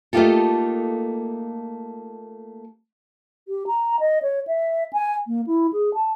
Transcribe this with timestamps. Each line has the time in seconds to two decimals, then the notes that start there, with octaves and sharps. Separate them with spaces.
0.13 A3 A#3 D#4 F4 G4 A4
3.47 G4
3.67 A#5
4.00 D#5
4.22 C#5
4.47 E5
4.93 G#5
5.27 A#3
5.47 E4
5.73 G#4
5.94 A5